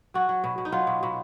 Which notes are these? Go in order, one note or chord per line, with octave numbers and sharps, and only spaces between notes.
F#3 F#4
F#3
B2
B2
D#4
F#3 F4
B2
B2